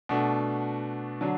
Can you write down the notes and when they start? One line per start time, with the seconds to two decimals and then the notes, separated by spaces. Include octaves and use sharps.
0.09 B2 A3 D4 F#4
1.21 D3 F#3 D4